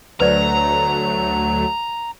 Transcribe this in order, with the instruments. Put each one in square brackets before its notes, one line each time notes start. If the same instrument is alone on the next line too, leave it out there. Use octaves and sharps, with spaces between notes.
[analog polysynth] D2 F#3 A3 [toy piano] B4 C5 D5 [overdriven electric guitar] A#5